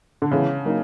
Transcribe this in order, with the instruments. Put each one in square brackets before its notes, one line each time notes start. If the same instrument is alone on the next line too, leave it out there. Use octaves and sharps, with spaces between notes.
[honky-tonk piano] D3
[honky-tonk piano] C#3 [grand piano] E3 G#3 B3 E4
[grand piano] F#3 A#3 D#4